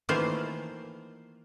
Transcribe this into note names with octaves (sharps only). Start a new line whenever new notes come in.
D#3 E3 A3 A#3 F4 C5